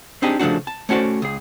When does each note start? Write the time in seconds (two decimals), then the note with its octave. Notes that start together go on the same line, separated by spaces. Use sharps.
0.22 C4 D4 D#4 G4 G#4
0.39 C#3 F3 A3 D4 F#4
0.67 A5
0.89 A3 C#4 F#4 C5 D5
1.22 C#2 G#4